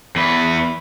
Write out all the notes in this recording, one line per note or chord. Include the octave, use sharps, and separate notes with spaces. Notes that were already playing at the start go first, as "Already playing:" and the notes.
E2 B4